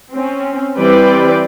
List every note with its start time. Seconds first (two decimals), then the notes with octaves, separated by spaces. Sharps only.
0.13 C4 C#4
0.78 E3 G3 C4 B4 D5 G5